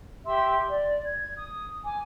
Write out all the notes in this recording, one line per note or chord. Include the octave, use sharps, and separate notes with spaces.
G4 E5 C6 E6
D5
G#6
D#6
G#5 D6